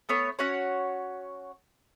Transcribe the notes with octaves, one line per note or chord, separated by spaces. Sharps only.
A3 B3 C#5
C#4 F#4 C#5